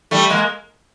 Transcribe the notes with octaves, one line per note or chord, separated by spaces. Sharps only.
G3 A3
G#3 A#3